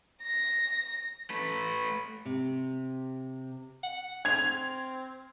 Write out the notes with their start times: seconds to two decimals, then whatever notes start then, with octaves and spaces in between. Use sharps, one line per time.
0.23 A#6
1.30 A3 B4
2.25 C3
3.83 F#5
4.25 C4 G#6 F7